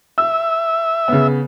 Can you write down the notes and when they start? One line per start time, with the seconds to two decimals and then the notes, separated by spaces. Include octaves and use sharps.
0.18 E5 E6
1.08 C#3 B3